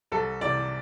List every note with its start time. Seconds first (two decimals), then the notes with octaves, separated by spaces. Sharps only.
0.12 C2 A4
0.41 C3 E3 D5